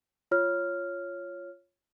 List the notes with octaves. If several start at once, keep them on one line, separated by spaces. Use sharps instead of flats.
F4 C#5 F6